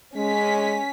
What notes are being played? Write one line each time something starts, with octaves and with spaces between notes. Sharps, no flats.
G#3 C#4 B6